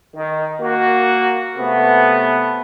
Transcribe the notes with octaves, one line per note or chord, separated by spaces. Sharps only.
D#3
A#3 F#4
C3 A3 B3